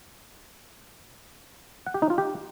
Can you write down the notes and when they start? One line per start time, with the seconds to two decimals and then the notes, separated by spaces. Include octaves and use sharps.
1.86 F#5
1.94 G4
2.02 D#4
2.10 F4
2.18 G4